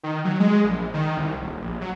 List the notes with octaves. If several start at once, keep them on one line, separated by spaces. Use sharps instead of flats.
D#3
F#3
G#3
A#1
D#3
C2
D#1
A#1
F#3